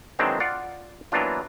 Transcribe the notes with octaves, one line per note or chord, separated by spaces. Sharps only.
D#3 E3 F#3 G#3 C4 D4
F4 D5 F5 F#5
E3 F#3 A#3 B3 D4 F4